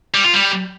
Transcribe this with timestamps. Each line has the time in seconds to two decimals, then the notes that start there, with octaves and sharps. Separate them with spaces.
0.14 G3
0.24 F4
0.34 G3